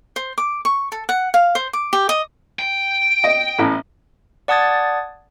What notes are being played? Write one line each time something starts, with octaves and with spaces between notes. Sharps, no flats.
C5
D6
C#6
A4
F#5
F5
C5
D6
G4
D#5
G5
D#5
A1 A2
D5 F#5 A5 D#6 G#6 A6